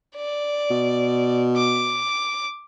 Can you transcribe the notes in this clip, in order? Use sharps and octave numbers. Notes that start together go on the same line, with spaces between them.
D5
B2
D6